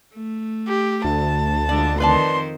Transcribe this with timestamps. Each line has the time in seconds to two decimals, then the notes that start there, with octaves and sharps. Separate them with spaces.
0.14 A3
0.67 G4
1.04 D2 A5
1.69 D3 G#3 F4 D5
2.00 F2 D#3 B4 C5 D5 A5 C6